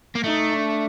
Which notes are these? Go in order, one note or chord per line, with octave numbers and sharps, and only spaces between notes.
A#3
A3 D#4
D4